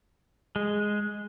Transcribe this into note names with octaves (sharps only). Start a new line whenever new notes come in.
G#3